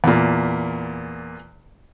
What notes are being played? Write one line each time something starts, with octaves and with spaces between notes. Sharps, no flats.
E2 A#2